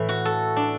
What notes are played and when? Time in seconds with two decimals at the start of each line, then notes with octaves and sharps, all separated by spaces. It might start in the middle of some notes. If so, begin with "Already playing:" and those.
Already playing: A2 E3
0.09 F#4
0.25 A4
0.56 D4